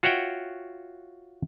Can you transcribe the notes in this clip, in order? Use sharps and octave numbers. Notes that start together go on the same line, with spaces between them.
F4 F#4 C#5 E5 F#5 G5